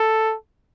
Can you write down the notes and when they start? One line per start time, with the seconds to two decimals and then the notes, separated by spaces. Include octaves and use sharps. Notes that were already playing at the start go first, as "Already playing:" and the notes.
Already playing: A4